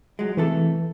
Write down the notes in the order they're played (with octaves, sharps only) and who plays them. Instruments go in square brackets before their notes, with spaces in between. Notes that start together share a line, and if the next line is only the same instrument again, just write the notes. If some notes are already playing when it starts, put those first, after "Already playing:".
[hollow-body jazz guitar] F#3 G#3
[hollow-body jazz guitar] C3 A3 A4 [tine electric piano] E3